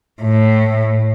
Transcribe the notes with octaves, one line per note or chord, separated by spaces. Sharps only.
A2